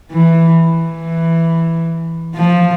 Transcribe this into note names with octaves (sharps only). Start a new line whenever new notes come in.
E3
E3
F3